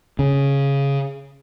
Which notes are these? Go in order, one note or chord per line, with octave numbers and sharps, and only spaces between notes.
C#3